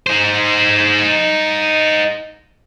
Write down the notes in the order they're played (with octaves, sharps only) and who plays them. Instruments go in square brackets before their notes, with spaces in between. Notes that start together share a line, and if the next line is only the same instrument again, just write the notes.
[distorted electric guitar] D#4 C5